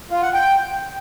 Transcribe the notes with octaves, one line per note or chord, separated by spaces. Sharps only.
F4
F#5
G5